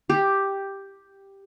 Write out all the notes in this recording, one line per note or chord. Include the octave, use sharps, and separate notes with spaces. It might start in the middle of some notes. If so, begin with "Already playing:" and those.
G4